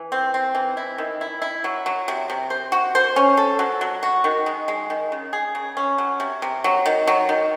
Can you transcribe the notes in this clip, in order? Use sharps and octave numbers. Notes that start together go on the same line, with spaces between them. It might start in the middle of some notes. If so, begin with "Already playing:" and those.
Already playing: E3
C4
C4
E3
E4
D#3
E4
E4
F#3
F#3
C3
C3
C5
F#4
C5
C#4
A4
F#3
F#3
F#4
D#3
G#3
G#3
D#3
C#3
G#4
C#3
C#4
F#3
C3
C3
F#3
D#3
F#3
D#3